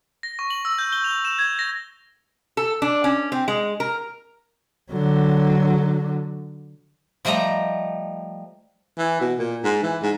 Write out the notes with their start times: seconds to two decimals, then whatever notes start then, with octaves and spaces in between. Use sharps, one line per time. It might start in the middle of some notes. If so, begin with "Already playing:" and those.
0.23 A#6
0.39 C#6
0.50 F#7
0.65 E6
0.78 G6
0.93 G7
1.04 F7
1.25 E7
1.39 G#6
1.59 A#6
2.57 A4
2.82 D4
3.04 C#4
3.32 C4
3.48 G#3
3.80 A#4
4.92 D3 F#3
7.25 F3 G3 A3 D#5 A#5
8.98 E3
9.21 B2
9.39 A#2
9.64 G#2
9.83 E3
10.03 G#2